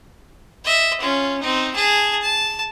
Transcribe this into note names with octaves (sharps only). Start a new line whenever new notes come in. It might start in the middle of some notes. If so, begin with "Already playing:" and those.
D#5 E5
C#4 F4
C4 D#4
G#4 A5
A5